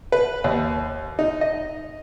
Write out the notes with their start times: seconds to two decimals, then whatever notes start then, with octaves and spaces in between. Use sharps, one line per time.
0.12 B4
0.44 D#2
1.19 D#4
1.41 D#5